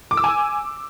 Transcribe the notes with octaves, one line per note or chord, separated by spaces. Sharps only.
D6
E6
G#5